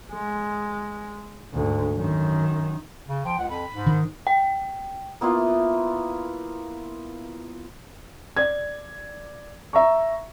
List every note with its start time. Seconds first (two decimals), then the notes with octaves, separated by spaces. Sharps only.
0.12 G#3
1.53 D2 G#2
1.96 F#2 D#3
3.09 C#3
3.25 F3 G5
3.38 C#2 F#5
3.50 F2 B5
3.72 G#2
3.86 D#3
4.27 G5
5.21 A#3 B3 E4 F4
8.37 D5 G#6
9.73 E5 A#5 C#6